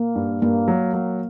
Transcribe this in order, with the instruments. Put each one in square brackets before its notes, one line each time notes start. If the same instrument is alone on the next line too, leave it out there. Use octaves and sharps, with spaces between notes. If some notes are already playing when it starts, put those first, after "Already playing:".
Already playing: [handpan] A#3
[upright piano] G2
[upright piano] G2 [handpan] A#3
[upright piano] F#3
F#3